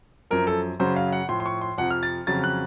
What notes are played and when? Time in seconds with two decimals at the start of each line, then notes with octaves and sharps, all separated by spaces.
0.31 F#2 F3 A#4
0.47 A4
0.80 F#2 C#3 F#3 C5
0.96 F5
1.13 F#5
1.29 A2 F3 C6
1.40 C6
1.46 C#6
1.61 C6
1.78 F2 C3 F3 F#5
1.90 F6
2.03 A6
2.27 F2 C#3 F#3 A6
2.44 F#6